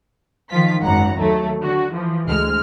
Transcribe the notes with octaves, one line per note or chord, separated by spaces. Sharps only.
D#3 F3 F4 B6
G#1 F#2 F#5 A#5
D#2 F#3 A3
D3 F#4
E3 F3
D2 G#3 F6